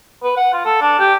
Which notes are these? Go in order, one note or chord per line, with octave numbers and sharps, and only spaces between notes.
B4
F#5
F4
A4
D4
G4